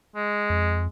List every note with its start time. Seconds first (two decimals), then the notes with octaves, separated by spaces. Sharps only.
0.16 G#3
0.50 F2